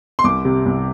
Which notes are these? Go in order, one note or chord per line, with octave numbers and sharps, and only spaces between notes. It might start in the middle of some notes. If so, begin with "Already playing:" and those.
C6
C2 D6
C3
C2